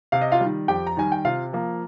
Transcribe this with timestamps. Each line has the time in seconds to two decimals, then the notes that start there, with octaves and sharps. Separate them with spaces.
0.12 C3 F5
0.21 D#5
0.32 F4 F5
0.41 D#3 G3
0.68 F2 G4 G5
0.87 A#5
0.97 D#3 G3 G#5
1.12 G5
1.25 C3 F4 F5
1.53 F3 A#3